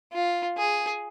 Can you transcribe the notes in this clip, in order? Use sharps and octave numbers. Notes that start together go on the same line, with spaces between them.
F4
G#4